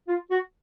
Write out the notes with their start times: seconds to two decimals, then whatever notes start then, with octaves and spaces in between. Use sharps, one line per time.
0.08 F4
0.31 F#4